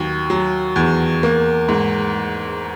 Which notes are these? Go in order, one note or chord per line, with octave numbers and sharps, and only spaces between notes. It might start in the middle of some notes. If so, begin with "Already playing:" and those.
Already playing: D#2 F#3
F#3
E2
A#3
G#2